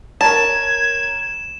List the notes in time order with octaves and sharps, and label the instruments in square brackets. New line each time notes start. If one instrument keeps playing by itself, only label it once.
[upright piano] A#4 C#5 A#5 [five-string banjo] A5 [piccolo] G#6 [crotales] E7